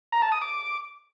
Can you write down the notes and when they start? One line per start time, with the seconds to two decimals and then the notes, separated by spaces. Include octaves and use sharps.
0.12 A#5
0.22 A5
0.32 D#6
0.42 D6